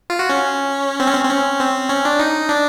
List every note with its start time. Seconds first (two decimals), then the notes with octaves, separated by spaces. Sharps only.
0.10 F4
0.19 F#4
0.29 C#4
1.00 C4
1.07 C#4
1.15 C4
1.25 C4
1.29 C#4
1.60 C4
1.89 C#4
2.05 D4
2.19 D#4
2.49 D4